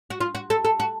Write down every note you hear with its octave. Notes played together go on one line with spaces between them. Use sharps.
F#4
F4
F#4
A4
A4
F#4